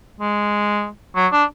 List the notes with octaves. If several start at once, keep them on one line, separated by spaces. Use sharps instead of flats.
G#3
F#3
D4